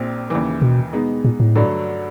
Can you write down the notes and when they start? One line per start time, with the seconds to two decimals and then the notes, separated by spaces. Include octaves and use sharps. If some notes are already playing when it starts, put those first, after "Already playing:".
Already playing: A#1 A#2 C4
0.30 D#2 C#3 E3
0.62 B2
0.93 B2 G#3 B3 D#4
1.25 A#2
1.40 A2
1.55 G2 D3 F#3 A3